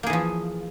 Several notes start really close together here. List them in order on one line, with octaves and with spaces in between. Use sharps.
A#3 G#4 E3 F3